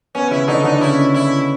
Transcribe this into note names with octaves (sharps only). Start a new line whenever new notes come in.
B3 C#4
C#3 C#4 E4
D3 D4 D#4
D3 D4 D#4
C#3 C#4 E4
E4